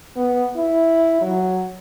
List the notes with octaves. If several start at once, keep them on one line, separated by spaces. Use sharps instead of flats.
B3
E4
F#3